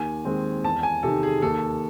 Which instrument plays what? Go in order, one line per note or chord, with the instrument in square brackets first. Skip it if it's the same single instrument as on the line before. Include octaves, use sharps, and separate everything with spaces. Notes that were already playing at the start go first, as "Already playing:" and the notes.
Already playing: [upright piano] D#2 [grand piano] G#5
[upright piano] D#3 G#3 C4
[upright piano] E2 [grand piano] A5
[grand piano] G#5
[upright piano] C3 D#3 [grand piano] A4
[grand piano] G#4
[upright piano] D#2 [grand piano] A4